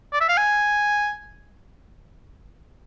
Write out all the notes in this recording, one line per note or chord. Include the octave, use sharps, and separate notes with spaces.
D5
E5
F5
G#5